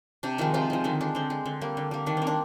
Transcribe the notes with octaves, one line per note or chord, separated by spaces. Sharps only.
C3 D4
D#3 F3 G#3 D#4
C3 F3 F4
F3 G#3
D3 D#3 D#4
G#3 D4
D3 C4
G#3
D3
G3 A#3
D3
G3 A#3
D#3 D4
A#3 C4
D4